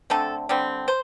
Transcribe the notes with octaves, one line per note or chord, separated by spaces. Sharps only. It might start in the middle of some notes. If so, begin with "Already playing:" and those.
D3 A3 C4 A4
D3 G3 C4
C5